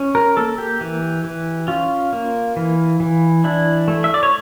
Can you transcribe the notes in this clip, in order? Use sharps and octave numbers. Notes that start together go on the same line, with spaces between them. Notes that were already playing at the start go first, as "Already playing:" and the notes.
Already playing: C#4
A#4
A#3 A4
G4
E3
E3
C#4 F4
A#3
E3
E3
D4 E4
A3
E5
D5
C#5